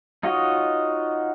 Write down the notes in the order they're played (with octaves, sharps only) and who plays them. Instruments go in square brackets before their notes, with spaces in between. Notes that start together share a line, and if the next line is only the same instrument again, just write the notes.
[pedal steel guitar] D#4 F4 F#4 C#5 D#5